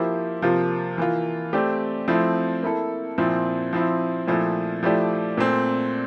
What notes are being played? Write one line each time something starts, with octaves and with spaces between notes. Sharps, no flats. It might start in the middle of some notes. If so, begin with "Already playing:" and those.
Already playing: F3 A#3 E4 G4 C5
C3 F3 A#3 F4
E3 A#3 F4
A3 C4 G4 D5
F3 A3 C4 E4
A#3 E4 A4
A#2 F3 C4 E4
F3 C4 E4
A#2 F3 A3 E4
F3 A3 E4 G4 D5
A#2 A3 C4